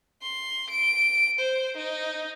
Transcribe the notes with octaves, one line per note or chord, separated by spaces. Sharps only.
C6
D7
C5
D#4